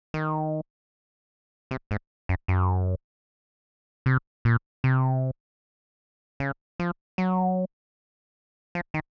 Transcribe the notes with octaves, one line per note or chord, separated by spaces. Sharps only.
D#3
C3
G#2
F#2
F#2
C3
A#2
C3
C#3
F3
F#3
F3
D#3